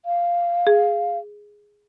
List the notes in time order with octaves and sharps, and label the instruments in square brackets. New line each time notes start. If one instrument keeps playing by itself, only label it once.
[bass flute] F5
[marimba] G#4